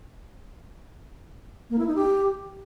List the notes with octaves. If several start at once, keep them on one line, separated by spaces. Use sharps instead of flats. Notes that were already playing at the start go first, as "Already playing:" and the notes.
A#3
E4
D#4
G4